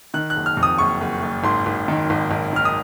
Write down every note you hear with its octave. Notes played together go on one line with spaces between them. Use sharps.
D#3 F#6
F#6
F#1
F6
F2
D#6
F#1 C#6
F#1
F#1
G#1 C6
G#1
D#3
G#1
G#1
D#3 F6
D#6